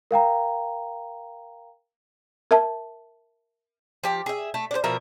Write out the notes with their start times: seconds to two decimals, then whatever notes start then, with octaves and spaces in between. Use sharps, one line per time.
0.11 A#4 F5 G5 A#5
2.51 A#4 E5 A5
4.03 F3 G4
4.26 G#4 E5
4.54 A3
4.71 D4 C5
4.84 B2 F3 A#4 E5